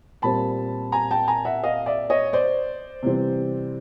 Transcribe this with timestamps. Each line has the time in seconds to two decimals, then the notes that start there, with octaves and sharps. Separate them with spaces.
0.22 A#2 G3 C4 A5 B5
0.92 G#5 A#5
1.11 G5 A5
1.28 G#5 A#5
1.45 E5 F#5
1.64 D#5 F5
1.86 D5 E5
2.10 C#5 D#5
2.33 C5 D5
3.03 C3 E3 G3 C4